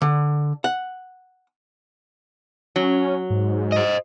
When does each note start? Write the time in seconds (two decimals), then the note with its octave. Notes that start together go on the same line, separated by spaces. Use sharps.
0.02 D3
0.64 F#5
2.76 F#3 C#4
3.30 G#2
3.72 C5 D#5